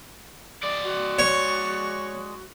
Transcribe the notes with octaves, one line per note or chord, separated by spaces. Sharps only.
G#3 D5
F#4
C#5